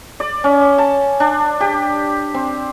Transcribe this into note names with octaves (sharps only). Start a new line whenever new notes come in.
D5
C#4
A5
D4
G4
C4